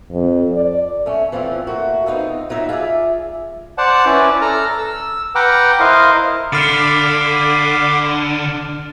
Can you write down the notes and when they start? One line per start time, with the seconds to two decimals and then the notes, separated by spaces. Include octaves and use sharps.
0.11 F2
0.52 D5
1.06 A3 C#4
1.32 E3 F3 C4 C#4 F4
1.67 A3 A#3 F#4
2.06 B3 C4 D#4 F4 A4
2.49 F3 F#3 D#4 D#5 E5
2.69 F4 G#4 A4 D5 E5
3.78 C5 D5 F#5 A5
4.06 C#4 E4 B4 D5
4.42 A4 A#5 F6
4.78 E6
5.35 B4 F#5 G5 A#5 D6 F6
5.80 E4 A#4 C5 D#5 F5
6.53 D3 F5 B5 D6 F6 A6